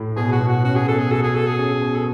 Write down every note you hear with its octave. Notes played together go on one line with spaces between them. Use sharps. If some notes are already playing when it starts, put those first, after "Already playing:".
Already playing: A2
B2 G#4
F#4
B2
F#4
C#4 F#4
G#4
B2 A4
G#4
F#4 A4
G#4
F#4 A4
G#4
C#4
B2
A4